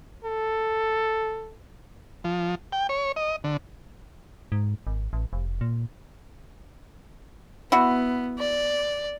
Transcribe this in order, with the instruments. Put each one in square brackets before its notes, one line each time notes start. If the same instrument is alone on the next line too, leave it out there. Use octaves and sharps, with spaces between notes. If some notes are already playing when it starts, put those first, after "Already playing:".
[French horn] A4
[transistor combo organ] F3
G5
C#5
D#5
D3
[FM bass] G#2
G#1
A1
F1
A#2
[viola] B3 [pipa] E4 F#4
[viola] D5